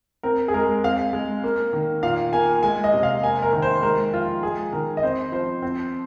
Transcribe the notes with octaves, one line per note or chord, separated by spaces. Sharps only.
C4 A#4
G#4
G#3 A#4
C4 F5
G#3
A#3
D#3
A#2 F5
A#3 G#5
G#3 G#5
D#5
C3
F5
A#3 G#5
A#4
D#3
C5
G#3 A#4
F3 F4
G#3 G#4
D#3 A#4
D#5
C4 C5
F3 C5
C4